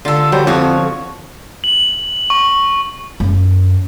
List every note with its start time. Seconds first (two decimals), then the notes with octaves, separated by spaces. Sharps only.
0.05 D3 F4 A4
0.32 F#3 G3 C5
0.47 F2 F3 F#4 C#5
1.64 F#7
2.30 C#6
3.20 F#2